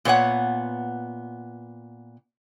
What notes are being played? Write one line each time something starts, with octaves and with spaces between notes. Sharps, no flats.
A#2 B3 C#5 F#5